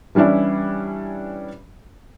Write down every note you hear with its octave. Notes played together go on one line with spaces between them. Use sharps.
E3 G3 C#4 D4 E4